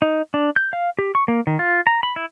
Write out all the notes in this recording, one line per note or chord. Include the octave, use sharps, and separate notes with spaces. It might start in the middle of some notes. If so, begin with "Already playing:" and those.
D#4
D4
G6
F5
G4
C#6
A#3
D#3
F4
A#5
B5
E4